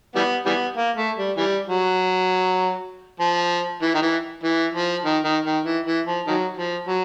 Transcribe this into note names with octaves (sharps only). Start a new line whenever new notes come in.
E3 G3 B3
E3 G3 B3
A#3
A3
G3
E3 G3
F#3
F3
E3
D#3
E3
E3
F3
D#3
D#3
D#3
E3
E3
F3
D#3 F#3
F3
F#3